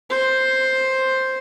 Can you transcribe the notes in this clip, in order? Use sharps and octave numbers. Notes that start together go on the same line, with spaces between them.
C5